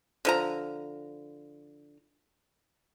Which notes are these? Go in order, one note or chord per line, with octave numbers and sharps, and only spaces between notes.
D3 F3 A#5